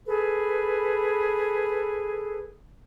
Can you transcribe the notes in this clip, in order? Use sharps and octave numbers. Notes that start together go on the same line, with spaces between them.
G#4 A4 B4